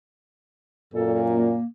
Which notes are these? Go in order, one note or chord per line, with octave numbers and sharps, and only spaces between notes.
F#2 A#2 A4
A#3